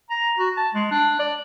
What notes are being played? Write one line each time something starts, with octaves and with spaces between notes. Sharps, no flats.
A#5
F#4
A5
G#3
D4
D5